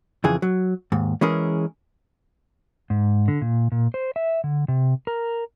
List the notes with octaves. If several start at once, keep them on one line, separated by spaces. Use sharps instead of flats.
F2 C#3 E3 G#4
F#3
D#2 G#2
E3 G#3 C#4 G#4 A#4
G#2
D3
A#2
A#2
C5
E5
D3
C3
A#4